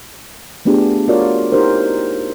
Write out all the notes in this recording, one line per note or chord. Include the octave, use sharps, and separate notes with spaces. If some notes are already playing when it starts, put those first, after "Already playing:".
A3 B3 D4 F4 G4 G#4
F4 F#4 A#4 C#5 D5
D#4 E4 G4 A#4 C5